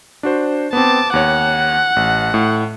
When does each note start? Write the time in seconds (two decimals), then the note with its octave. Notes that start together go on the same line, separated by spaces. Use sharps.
0.23 D4 F#4 C5
0.73 B3 C4 A5 D6
1.13 D#2 C#5 F#5
1.96 A1
2.34 A2